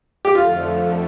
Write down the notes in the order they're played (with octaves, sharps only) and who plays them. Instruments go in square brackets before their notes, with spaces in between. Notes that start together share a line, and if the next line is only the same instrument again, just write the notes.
[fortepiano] G4
[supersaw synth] F2 D3 F3 A3 [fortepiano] F4